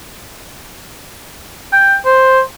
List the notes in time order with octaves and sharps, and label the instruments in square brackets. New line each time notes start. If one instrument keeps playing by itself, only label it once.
[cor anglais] G5
C5